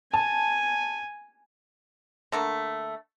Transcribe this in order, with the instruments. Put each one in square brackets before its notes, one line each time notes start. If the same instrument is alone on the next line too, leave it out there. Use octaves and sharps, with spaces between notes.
[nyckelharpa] G#5 [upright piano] A5
[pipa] D3 A3 A#3